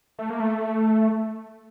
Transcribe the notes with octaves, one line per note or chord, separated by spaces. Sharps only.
A3
A#3
A3